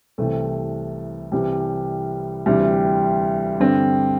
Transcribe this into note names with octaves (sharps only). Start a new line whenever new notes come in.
C2 C3 E3 A3
C2 C3 E3 G3
D2 C3 E3 G3
G2 D3 C4